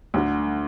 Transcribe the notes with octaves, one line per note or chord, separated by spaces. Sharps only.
D2 D3